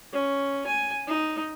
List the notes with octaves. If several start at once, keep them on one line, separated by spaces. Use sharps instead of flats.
C#4
G#5
D#4